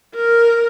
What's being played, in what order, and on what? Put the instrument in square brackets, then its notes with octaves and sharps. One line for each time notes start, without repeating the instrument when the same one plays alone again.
[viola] A#4